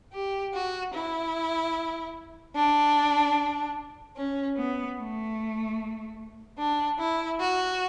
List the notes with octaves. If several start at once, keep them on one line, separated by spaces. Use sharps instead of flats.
G4
F#4
E4
D4
C#4
B3
A3
D4
E4
F#4